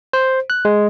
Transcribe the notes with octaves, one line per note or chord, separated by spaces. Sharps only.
C5
F#6
G#3